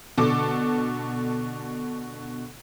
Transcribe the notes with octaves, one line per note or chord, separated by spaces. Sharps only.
B2 D3 A4 D6